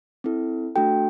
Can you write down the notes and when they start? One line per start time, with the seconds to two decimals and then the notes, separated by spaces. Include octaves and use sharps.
0.24 C4 E4 A4
0.75 A3 D4 F#4 A4 G5